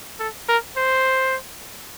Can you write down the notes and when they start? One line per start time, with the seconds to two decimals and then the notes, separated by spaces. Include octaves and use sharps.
0.19 A4
0.48 A#4
0.77 C5